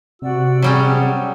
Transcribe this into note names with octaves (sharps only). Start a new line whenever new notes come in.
C3 F#4 D5 F#5 E6
F#3 G3 C#4 G#4